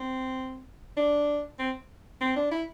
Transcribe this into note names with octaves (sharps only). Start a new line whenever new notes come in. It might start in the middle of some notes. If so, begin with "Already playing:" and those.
Already playing: C4
D4
C4
C4
D4
E4